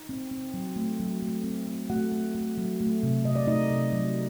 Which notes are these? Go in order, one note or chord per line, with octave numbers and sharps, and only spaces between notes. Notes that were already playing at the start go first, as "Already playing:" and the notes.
Already playing: D#4
C4
C4
F#3
A3
F#3
A3
C4
C4
A3 F#4 F#5
A3
A3
F#3
A3
C3
C3 D#5
D5
A3 D#4 D#5
C3
F#3